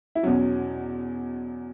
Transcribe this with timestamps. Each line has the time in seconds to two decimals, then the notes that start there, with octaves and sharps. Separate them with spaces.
0.15 E4
0.23 E2 B2 F#3 C#4